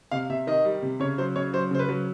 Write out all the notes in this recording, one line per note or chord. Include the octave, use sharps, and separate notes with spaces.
C3 F5
C3 E5
D#3 D#5
G3
C3
C#3 C#5
F#3 C5
C#3 C#5
F#3 C5
C#3 C5
B4
F#3